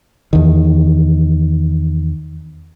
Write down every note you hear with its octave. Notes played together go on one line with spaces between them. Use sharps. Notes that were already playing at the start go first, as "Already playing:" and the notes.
E2 D#3